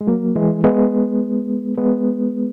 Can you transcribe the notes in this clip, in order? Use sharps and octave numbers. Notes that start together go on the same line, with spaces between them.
G#3
F#3 A#3
E3 G#3
G#3 B3
G#3 B3